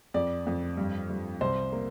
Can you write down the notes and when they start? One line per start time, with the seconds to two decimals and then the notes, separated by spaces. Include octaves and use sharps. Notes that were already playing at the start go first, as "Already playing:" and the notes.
0.14 F2 D5
0.47 F2
0.77 G2
1.10 G2
1.41 C2 C5
1.72 A#3